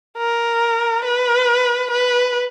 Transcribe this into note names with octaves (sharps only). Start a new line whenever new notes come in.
A#4
B4
B4